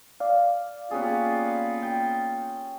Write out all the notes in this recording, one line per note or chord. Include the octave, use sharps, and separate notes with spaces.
D5 F5
A#3 B3 C#4 F4 G4 G#4
G5